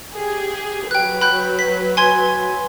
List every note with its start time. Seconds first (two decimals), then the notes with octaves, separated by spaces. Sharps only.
0.15 G4 G#4
0.91 F#3 B4 G5 F#6
1.21 B5 F#6 G6
1.59 B6
1.97 G#5 C6 G#6